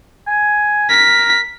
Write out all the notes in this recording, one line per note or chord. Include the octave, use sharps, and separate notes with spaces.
G#5
A#4 B6